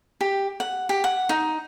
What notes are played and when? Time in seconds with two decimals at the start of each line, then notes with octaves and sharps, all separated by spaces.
0.21 G4
0.60 F#5
0.89 G4
1.04 F#5
1.29 D#4